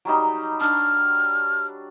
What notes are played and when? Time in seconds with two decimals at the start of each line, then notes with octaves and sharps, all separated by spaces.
0.05 F#3 G3 D#4
0.61 D4 F6